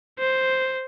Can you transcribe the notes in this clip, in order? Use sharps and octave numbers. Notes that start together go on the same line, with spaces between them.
C5